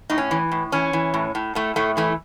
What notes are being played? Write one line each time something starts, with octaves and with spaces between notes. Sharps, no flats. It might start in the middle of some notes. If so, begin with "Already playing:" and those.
A2 D#4
C#4
E3
A2
E3 C#4
E3
A2
A2
A2 A3
A2 A3
E3 A3